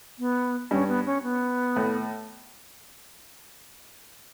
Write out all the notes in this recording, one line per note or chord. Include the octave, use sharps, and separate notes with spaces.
B3
G2 C#4
B3
C#4
B3
A2